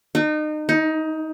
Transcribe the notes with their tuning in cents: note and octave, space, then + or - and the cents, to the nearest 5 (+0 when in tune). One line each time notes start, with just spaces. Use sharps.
D#4 -30
D#4 +20